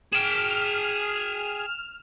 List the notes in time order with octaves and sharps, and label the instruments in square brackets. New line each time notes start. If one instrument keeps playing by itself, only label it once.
[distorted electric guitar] G#4 G5 [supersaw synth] F6 [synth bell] E7